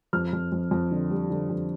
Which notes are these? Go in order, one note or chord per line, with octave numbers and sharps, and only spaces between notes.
F2 F6
F2
F2
F2
D3
G3
D3
F2